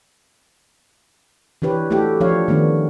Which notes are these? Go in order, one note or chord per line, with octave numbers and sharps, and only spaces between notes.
E3 D4 G4 B4 C#5
A3 E4 F#4 G4 A4
F3 D4 C#5 F5
D#3 A3 B3 D4